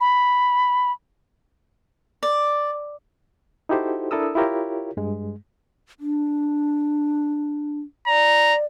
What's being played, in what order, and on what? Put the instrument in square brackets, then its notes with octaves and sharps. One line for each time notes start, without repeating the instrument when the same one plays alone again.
[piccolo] B5
[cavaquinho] D5
[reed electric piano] D#4 E4 F#4 G4 A4 C5
D4 E4 A4 A#4 D#6 E6
E4 F4 G4 A#4 C#5
G2 G#3
[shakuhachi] D4
[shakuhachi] D5 [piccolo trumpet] A#5